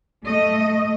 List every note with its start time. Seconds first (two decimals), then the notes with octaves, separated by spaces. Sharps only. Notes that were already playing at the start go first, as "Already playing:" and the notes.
0.25 A3 D#5